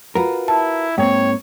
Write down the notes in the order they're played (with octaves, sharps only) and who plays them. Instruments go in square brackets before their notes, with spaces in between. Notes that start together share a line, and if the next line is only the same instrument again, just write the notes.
[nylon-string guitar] F4 F#4 B4 [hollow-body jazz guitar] A#4
[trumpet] E4 [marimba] A5
[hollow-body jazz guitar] G#2 A#3 C4 [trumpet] C#5 [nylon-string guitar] G5